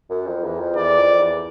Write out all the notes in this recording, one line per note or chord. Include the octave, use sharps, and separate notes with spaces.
F#2
F2
E2
F2
E2 D5
F2
E2